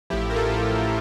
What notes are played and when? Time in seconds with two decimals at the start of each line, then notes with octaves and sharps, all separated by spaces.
0.10 A1 A2 F3 E4 G4
0.30 A#4
0.36 F4 A4